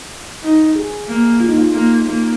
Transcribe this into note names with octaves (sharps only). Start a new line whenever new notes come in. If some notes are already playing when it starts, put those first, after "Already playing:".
D#4
G#4
A#3
F4
D#4
F4
A#3
A#3